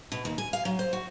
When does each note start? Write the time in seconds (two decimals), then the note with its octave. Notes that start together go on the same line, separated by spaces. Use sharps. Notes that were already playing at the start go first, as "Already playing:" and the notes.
0.12 B2
0.25 D#2
0.38 G#5
0.53 F5
0.65 F#3
0.79 C5
0.93 F#4